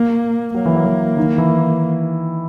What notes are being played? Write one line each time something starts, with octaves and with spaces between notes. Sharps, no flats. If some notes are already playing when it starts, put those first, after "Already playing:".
Already playing: A#3
F#3 A#3
E3
F#3
E3
D#3
E3